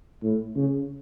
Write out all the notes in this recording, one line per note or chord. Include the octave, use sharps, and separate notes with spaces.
A2
C#3